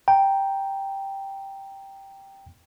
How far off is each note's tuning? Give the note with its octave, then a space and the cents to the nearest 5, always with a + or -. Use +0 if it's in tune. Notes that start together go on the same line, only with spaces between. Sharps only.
G5 +0 A#5 +10